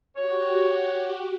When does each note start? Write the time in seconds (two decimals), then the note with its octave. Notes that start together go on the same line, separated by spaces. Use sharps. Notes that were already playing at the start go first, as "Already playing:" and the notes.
0.16 F#4 G4 C#5